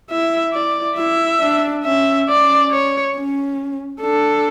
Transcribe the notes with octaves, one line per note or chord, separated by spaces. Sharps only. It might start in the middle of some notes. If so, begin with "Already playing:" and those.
E4 E5
E4 D5
E4 E5
D4
C#4 E5
C#4 D5
C#5
C#4
D4 A4